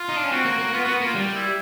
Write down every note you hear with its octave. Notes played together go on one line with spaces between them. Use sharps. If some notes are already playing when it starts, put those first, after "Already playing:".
Already playing: F4
D#4
D4
C#4
C4 F#4
A#3
A#3
B3 F4
B3 F#4
A#3 F4
G3
E4